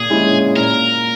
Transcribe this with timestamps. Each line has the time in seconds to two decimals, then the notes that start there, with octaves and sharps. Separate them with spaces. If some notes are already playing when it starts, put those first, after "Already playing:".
Already playing: A#2 G#4
0.10 G#3 C#4 E4
0.56 A#2 A#4